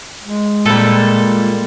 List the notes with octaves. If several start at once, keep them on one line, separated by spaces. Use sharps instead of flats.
G#3
A#2 G3 A4